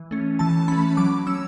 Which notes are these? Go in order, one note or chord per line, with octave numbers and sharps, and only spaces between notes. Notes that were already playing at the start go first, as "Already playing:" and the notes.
Already playing: E3
A3 C#4
E3 A5
A3 C#4 B5
F#3 D6
C#4 E6